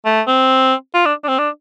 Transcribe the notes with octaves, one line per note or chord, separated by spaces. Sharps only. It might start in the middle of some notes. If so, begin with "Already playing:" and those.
A3
C4
F4
D4
D4
C4
D4